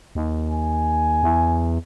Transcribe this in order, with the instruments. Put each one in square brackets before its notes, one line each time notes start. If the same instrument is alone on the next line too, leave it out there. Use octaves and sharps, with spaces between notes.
[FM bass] D#2
[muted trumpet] G#5
[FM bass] E2